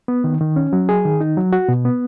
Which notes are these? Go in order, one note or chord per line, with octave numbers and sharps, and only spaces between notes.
B3
D#3
D#3
C#4
F#3
G#4
D#3
D#4
F#3
F#4
B2
B3